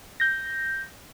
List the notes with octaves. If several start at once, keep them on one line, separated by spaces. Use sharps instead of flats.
G6 A#6